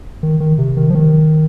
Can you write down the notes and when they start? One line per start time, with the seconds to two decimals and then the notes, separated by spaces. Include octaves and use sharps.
0.23 D#3
0.40 D#3
0.58 C3
0.77 D#3
0.90 F3
0.95 D#3